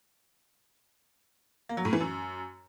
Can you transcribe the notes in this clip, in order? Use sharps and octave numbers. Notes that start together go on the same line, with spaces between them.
A#3
F#3
A2
E3
F#2